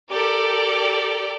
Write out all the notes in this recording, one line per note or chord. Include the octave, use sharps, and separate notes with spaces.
G4 A4 A#4 D5 D6